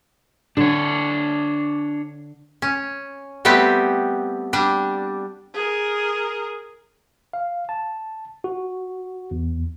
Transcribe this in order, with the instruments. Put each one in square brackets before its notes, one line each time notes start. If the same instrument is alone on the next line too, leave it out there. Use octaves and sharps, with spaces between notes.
[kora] D3 [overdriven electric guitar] D4 C#5
[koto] C#4
G3 A3 B3 C4 G4
G3 D4
[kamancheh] G#4 A#4
[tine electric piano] F5
A5
F#4
E2